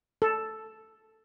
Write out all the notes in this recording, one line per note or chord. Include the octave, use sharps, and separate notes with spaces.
A4